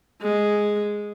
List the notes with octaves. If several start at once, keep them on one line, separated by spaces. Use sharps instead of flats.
G#3